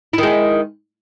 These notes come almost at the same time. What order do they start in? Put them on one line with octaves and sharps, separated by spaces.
E4 D#3 G#3